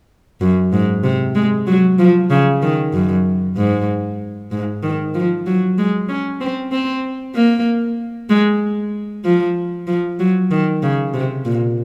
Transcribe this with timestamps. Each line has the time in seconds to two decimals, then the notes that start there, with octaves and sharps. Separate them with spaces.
0.41 F#2
0.73 G#2
1.04 C3
1.35 G#3
1.67 F#3
1.99 F3
2.30 C#3
2.62 D#3
2.93 F#2
3.57 G#2
4.51 G#2
4.83 D#3
5.14 F3
5.46 F#3
5.78 G#3
6.09 C#4
6.41 C4
6.72 C4
7.35 A#3
8.30 G#3
9.25 F3
9.87 F3
10.19 F#3
10.51 D#3
10.83 C#3
11.14 C3
11.45 A#2